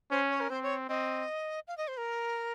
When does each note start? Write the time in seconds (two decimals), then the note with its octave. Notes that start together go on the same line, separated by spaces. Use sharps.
0.11 C#4 C5
0.30 C#5
0.40 A#4
0.50 C4 C5
0.63 C#5
0.89 C4 D#5
1.68 F5
1.77 D#5
1.88 C5
1.97 A#4